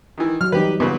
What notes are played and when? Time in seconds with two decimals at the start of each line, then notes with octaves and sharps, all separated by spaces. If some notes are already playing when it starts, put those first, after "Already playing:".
0.18 D#3 E3
0.41 F#3 F6
0.52 E3 G3 D#4 G4 B4
0.80 A#2 C#3 B3 B4